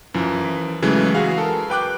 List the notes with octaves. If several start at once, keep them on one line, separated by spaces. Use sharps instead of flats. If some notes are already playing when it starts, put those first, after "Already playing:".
F#2 E3 F3
C#3 E3 F#3 G#3 A3
F#4 G#4 B4 F5
A4 A#4
B4 G5 D6 F#6